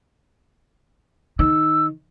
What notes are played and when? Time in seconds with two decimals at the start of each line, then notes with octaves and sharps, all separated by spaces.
1.39 D#3 E6